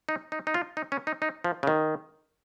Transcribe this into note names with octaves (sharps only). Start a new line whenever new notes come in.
D#4
D#4
D#4
F4
D#4
C#4
D#4
D#4
F3
C#3
D#3